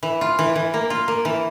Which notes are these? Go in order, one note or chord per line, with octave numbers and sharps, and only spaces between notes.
E3
F4
E3
E3
A#3
F4
A#3
E3